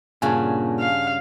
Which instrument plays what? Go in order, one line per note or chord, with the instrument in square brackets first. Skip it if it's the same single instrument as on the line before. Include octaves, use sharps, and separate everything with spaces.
[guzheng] G2 C#3 F#4 [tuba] A#2 [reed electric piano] G#5 A5
[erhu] F5